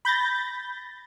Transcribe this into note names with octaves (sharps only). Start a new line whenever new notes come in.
B5 G6 A6 A#6